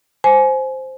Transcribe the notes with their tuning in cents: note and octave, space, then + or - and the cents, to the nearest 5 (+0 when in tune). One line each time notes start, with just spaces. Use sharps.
C5 +0 G#5 +25